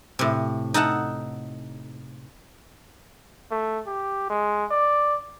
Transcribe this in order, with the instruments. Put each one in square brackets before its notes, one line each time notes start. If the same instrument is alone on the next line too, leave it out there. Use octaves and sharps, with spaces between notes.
[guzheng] A2 C3
D#4 A4 F#5 A5
[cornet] A3
G4
G#3
D5